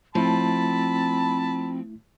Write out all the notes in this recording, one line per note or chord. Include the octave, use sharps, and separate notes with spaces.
F3 A3 C4 E4 A5 B5